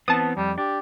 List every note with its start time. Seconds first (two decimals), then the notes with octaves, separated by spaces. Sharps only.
0.08 E3 B3 C4 A5 D#6
0.37 F2 G3
0.58 D4 G4